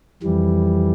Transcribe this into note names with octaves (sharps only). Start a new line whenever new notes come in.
F2 E3 G3